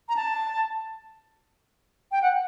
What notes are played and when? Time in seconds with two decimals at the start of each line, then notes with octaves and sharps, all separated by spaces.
0.09 A#5
0.16 A5
2.12 G5
2.22 F#5